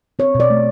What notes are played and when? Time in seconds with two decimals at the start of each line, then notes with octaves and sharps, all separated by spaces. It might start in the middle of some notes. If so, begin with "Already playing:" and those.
0.19 C4 C#5
0.35 B2
0.40 D5
0.50 A3